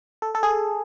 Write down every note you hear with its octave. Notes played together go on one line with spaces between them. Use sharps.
A4
A4
G#4